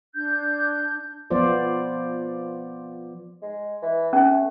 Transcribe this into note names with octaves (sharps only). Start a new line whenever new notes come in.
D4 G6
F3 B3 F4 C5 D5
G#3
E3
C#4 G#4
A3